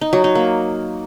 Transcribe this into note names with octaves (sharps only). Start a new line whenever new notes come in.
D#4
F#3
D#4
A#3